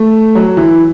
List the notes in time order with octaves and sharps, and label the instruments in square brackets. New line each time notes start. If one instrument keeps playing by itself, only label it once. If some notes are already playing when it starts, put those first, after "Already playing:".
Already playing: [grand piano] A3
F#3
E3